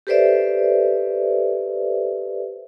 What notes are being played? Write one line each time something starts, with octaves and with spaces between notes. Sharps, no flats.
G4 A4 B4 C5 D5 E5